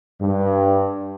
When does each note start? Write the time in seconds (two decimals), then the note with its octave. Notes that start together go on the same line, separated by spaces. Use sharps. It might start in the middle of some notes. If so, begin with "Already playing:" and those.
0.20 G2